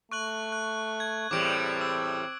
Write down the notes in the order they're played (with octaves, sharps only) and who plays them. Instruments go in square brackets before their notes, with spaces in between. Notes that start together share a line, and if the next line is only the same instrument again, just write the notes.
[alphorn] A3 [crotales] C#6 F#6 F#7
[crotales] F#6
G#6
[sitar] E2 A2 G3 [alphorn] C4 [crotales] D6 D7
[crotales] E6